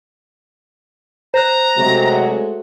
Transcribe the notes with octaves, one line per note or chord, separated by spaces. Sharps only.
C5 A#5 F#6
C3 F#3 G#3 A3 F#4